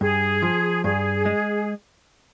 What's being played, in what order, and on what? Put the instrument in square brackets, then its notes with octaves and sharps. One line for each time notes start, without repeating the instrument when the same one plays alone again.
[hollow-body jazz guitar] G2 [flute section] G#4
[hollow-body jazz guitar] F3
[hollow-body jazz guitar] G2 [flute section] G#4
[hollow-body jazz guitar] G#3